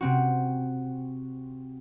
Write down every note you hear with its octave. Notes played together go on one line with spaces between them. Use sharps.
C3 C4 F#4